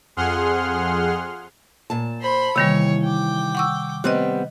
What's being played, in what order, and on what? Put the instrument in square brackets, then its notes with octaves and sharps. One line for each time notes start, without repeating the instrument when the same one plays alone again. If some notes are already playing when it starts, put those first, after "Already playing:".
[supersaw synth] F2 G#4 F#5 C6 F6
[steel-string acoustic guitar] A#2 A5
[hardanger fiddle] C5 B5
[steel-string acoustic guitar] D#2 E3 [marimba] C3 D#3 G3 [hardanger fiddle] C#5
[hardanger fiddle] G5 D6
[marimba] F#5 C#6 E6
[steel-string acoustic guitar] G3 B3 C4 [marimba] D#5 F#6